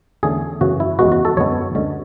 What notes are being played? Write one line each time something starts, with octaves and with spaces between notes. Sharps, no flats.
E2 D3 A3 C#4 G#4
F#2 C#3 E3 F#4
E4
E2 C#3 G#3 B3 F#4
F#4
A4
F#2 D3 G#3 B3 C#5
D2 D3 G#3 C#4